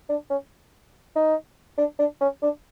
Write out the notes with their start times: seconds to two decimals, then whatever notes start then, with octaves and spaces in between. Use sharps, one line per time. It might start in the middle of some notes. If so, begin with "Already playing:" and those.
0.09 D4
0.30 C#4
1.16 D#4
1.78 D4
1.99 D4
2.21 C#4
2.42 D4